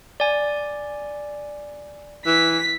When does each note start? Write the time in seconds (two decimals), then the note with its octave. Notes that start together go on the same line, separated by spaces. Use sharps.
0.20 D5 G#5
2.26 E3 B6